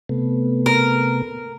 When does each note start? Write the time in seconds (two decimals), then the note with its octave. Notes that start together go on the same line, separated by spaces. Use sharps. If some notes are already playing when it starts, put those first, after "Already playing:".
0.09 C3 A3 B3
0.66 A#4